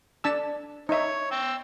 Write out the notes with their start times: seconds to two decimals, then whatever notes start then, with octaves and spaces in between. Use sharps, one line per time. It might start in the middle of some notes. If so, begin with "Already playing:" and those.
0.24 D4 A5 E6
0.89 D#4 C#5 E5
1.31 G5 E6